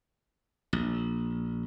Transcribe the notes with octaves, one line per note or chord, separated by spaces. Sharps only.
A#1